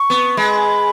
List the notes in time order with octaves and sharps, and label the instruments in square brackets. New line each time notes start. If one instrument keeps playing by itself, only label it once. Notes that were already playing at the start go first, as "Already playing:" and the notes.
Already playing: [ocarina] C#6
[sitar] B3
[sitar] G#3 [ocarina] B5